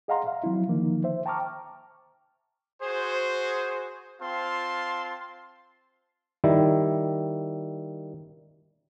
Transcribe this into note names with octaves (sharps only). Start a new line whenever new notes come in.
G#4 D#5 F5 F#5 A#5 C6
E5 F5
F3 F#3 C4 E4
D3 D#3 F3 A#3 D#4
C5 E5
G5 A5 A#5 C#6 D6 F6
F#4 G#4 C5
C4 F4 F5 A5 C6
D#3 G3 E4